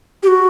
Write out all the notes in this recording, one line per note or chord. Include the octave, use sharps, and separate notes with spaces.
G4
F#4